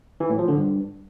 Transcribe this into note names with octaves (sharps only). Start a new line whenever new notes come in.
E3
A2
F3
D3
G2